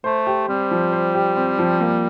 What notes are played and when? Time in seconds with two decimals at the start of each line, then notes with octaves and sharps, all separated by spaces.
0.04 A3 C5
0.27 G4
0.48 G3 C4
0.71 F3
0.92 C5
1.15 G4
1.36 C4
1.59 F3
1.80 A#3